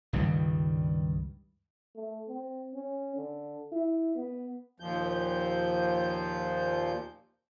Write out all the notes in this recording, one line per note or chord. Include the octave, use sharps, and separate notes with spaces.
C#2 G2 D#3 G3
A3
C4
C#4
D3
E4
B3
D#2 A#2 F3 G6